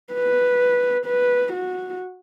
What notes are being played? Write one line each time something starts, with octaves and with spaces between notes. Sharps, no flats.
B4
B4
F#4